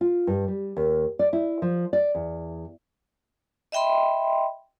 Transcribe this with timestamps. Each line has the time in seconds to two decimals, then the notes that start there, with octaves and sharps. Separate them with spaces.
0.01 F4
0.27 G2
0.48 G3
0.77 D#2
1.19 D5
1.33 E4
1.62 F3
1.93 D5
2.15 E2
3.72 D#5 E5 G5 B5 C6